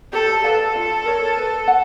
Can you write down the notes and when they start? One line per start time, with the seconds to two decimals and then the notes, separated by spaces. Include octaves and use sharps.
0.13 G4 A4
0.44 A4 B4 D5 F5
0.76 F4
1.06 A#4 C#5
1.37 B4
1.68 F#5